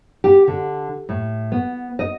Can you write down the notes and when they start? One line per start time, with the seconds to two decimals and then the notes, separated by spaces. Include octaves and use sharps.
0.24 G4
0.48 D3
1.09 A2
1.52 B3
1.99 D#5